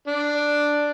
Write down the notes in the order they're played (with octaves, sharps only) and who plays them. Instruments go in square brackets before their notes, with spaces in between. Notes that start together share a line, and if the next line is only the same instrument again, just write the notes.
[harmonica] D4